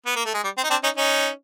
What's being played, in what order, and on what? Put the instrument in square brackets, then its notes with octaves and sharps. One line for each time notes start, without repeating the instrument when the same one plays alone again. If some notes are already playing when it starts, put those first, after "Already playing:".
[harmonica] B3
A#3
A3
G#3
G3
C4
D#4
C4 D4
C#4 D#4
C#4 D#4